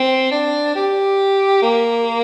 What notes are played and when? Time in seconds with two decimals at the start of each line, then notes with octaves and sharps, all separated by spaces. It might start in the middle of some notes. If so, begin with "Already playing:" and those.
Already playing: C4
0.31 D4
0.75 G4
1.62 A#3